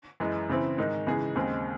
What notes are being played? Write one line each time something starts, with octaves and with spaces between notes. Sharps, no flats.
F#2 E3 G#3
C#3 E3 C4 E4
G#2 D#3 G#3 D#4
C#3 E3 G#3 D#4 G#4
D#2 C#3 G#3 C4